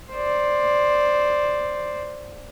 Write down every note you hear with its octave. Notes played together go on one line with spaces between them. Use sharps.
C5 D5